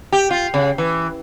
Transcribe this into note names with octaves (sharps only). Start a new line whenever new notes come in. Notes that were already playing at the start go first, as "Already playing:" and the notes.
G4
F4
C#3
E3